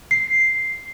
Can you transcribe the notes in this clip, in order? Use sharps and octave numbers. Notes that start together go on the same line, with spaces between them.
C7